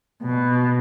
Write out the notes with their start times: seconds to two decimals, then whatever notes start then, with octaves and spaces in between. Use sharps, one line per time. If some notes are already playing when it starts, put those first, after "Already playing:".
0.23 B2